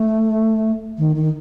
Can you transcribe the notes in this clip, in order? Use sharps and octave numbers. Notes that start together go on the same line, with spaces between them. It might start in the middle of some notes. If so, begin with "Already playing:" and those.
Already playing: A3
D#3
D#3